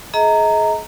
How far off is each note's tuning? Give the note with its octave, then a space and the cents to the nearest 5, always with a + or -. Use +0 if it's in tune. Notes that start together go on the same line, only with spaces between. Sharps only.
G#4 +35 D#5 +35 A#5 -15